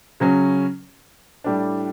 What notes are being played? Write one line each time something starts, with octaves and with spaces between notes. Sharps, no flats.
C#3 F#3 C#4
A2 G3 D4